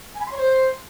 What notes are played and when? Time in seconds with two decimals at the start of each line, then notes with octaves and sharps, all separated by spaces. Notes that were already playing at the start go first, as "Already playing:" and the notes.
0.15 G#5
0.20 B5
0.26 C6
0.32 C#5
0.37 C5